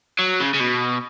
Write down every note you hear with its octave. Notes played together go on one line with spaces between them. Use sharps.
F#3
C#3
C#3
B2